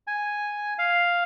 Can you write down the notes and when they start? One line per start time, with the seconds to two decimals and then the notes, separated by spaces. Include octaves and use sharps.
0.07 G#5
0.78 F5